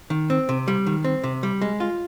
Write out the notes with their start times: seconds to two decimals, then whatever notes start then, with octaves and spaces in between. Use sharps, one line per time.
0.10 D#3
0.30 C4
0.49 C3
0.68 G3
0.86 D#3
1.04 C4
1.24 C3
1.43 G3
1.62 G#3
1.80 F4